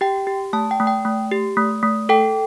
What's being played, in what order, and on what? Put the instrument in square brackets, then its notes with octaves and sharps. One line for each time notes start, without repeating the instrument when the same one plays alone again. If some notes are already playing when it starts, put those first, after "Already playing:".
[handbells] G4 G5
G4
A3 A5
G5
A3
G5
A3
G4
A3
A3
A4 G5